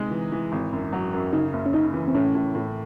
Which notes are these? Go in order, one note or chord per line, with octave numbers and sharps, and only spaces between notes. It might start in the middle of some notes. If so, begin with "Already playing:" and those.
Already playing: C3 G#3 D#4
E3
E3
G#1
F#2
F#3
F#2
C#3 D#4
F#1
C#4
C#3 D#4
E3
C4
A2 C#4
A2
A2